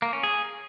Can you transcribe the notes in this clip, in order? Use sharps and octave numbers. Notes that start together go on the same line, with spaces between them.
A#3
C#4
G#4